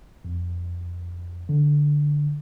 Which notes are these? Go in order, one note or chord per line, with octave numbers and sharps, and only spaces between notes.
F2
D3